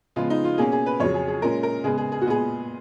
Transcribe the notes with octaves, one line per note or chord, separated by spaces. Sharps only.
C#3 F3 G#3 B3 F4
D#4
F4
B2 A#3 C#4 G#4
G#4
B4
F2 C#3 F#3 C#5
G#4
G#4
A#2 G#3 C#4 A#4
A#4
C#3 G#3 B3 G#4
G#4
G#4
F#4
A#2 G#3 B3 G#4